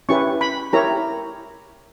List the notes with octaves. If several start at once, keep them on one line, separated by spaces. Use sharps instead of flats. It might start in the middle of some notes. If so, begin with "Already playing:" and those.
C#4 E4 G4 B4 C#6
B5
E4 G4 A#4 C#5 A#5